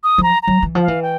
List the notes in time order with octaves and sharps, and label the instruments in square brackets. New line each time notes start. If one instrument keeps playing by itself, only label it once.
[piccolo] D#6
[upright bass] F3 [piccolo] A#5
[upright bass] F#3 [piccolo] A#5
[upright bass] E3
F3
[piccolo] F5
[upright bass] E3
[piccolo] G5